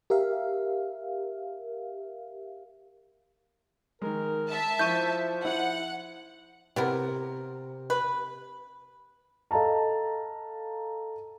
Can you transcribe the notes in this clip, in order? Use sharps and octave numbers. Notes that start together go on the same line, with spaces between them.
G4 A#4 E5 F5
D#3 G#3 A#4
E5 A5
F3 E4 C#6 G6 D#7
E4 F#5
C3 B3 E4 A#4
B4
A4 D#5 F5 A5 A#5